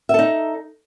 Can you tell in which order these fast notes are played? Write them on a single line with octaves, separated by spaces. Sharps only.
E5 A4 D#4